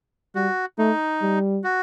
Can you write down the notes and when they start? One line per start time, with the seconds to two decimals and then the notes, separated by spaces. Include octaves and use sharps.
0.35 G3 F#4
0.78 A3 D#4
1.22 G3
1.64 F#4